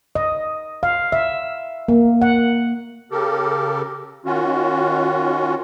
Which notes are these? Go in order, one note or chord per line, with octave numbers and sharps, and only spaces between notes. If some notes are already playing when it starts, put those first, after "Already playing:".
D#5
F5
E5
A#3
F#5
C#3 G4 A4 A#4
D#3 C#4 F4 F#4